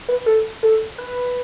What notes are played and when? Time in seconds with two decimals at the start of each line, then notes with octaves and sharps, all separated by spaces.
0.09 B4
0.26 A4
0.63 A4
0.98 B4